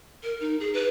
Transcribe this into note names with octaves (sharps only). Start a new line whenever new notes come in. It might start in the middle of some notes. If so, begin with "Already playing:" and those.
A#4
D#4
G#4
B4